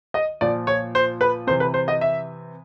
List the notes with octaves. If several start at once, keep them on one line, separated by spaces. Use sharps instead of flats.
D#5
A#2 F3 D5
C#5
C5
B4
C3 E3 C5
B4
C5
D#5
E5